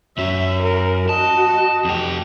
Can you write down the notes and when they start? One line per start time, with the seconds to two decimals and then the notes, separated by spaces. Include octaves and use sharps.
0.18 F#2 F#3 E5
0.64 A#4
1.09 F#4 D#5 A5
1.85 F2 G4